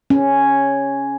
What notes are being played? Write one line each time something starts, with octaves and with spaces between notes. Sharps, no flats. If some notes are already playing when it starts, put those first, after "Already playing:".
C#4